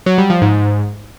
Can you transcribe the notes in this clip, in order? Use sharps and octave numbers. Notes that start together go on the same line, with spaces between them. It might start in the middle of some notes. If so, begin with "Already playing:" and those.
F#3
G3
F3
G#2